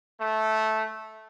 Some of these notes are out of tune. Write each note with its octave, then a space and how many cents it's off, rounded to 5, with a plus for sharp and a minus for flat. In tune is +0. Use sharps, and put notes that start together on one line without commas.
A3 -10